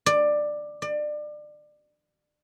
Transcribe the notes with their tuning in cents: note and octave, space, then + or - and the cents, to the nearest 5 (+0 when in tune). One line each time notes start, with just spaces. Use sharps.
D5 +15
D5 +30